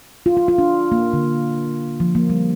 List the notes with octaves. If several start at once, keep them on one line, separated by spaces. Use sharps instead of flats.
F4
F4
F4
D4
A#3
D3
F3
A#3
G3